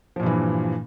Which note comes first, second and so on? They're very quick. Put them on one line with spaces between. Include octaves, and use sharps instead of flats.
F3 A#2 G2 E3